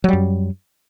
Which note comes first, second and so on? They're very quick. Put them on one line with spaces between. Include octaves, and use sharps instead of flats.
F#3 G3 F#2